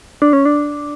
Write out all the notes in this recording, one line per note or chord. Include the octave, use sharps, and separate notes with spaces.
D4
C#4
D4